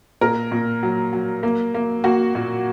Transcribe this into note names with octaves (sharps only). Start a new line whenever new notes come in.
A#2 A#4
A#2
F#3
F#3
A#3
A#3
A#3 F#4
A#2